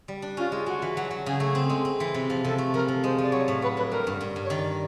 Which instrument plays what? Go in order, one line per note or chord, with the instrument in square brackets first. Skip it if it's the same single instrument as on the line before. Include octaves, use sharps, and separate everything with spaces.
[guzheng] G3
D4
[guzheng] C#4 [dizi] F4
[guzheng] G#3
[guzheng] G#3 [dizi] F#4
[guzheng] E3
F#3
F#3
[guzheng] C#3 [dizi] G#4
[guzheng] A3
C4
G#3
C4
E3
C3
F3
[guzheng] C3 [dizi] A4
[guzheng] A3
[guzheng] F3 [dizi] A#4
[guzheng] F3
[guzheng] G#3 [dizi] C5
[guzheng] F3 [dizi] D5
[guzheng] F#3 [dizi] C#5
[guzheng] A2
[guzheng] F#3 [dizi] B4
[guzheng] D4 [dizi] B4
[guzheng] G3 [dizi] A#4
[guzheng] G2
G2
G2
[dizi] C#5
[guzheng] D#3 [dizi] D5